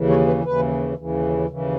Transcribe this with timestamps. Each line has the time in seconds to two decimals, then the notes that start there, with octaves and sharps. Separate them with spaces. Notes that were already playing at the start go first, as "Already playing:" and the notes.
Already playing: D#2 C#3 E3
0.09 C#5
0.27 B4
0.44 D#2 C#3 E3 B4
0.97 D#2 C#3 E3
1.50 D#2 C#3 E3